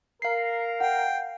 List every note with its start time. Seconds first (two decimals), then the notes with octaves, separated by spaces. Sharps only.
0.22 A#4 F5 C7
0.80 F#5 G5